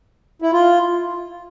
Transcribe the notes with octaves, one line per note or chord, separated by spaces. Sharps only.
E4
F4